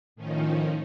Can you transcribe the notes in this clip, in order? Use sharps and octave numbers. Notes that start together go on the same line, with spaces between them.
A2 D#3 F3 C#4 D#4